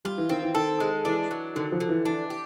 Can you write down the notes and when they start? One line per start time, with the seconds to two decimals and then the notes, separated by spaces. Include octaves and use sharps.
0.05 G3 F4
0.18 E3
0.29 D#3 C4
0.43 E3
0.55 D#3 A4
0.80 G#3
1.05 E3 D4
1.31 F#3
1.56 D3 D#3
1.72 F3
1.80 D3
1.89 E3
2.05 E3 D4
2.30 G4